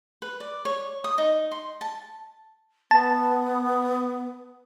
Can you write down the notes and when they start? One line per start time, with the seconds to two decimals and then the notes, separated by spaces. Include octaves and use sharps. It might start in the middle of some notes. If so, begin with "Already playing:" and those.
0.22 B4
0.40 D5
0.65 C#5
1.04 D#6
1.18 D#4
1.51 C6
1.81 A5
2.91 B3 A5